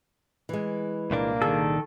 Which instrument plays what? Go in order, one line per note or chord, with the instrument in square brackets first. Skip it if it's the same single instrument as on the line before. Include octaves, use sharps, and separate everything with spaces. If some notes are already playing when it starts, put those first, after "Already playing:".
[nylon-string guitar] E3 G#3
[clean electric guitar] C2 A#2 D4 [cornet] A#3
[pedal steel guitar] D#3 A4 [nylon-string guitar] G#4